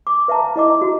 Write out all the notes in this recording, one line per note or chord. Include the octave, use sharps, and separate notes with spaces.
D6
B4 E5 F5 A5 A#5
E4 D#5 D6
F#4